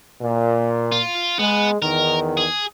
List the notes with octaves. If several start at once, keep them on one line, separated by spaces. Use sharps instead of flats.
A#2
F4
G#3 B3
E2 D#3 A#4
G#4